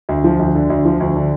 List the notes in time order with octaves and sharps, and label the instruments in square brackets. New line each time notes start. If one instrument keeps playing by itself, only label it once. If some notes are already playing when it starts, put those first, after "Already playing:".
[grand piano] D2
F3
D2
D3
D2
F3
D2
D3